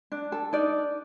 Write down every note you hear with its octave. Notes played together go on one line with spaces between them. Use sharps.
D4
A4
D4 D#4 D5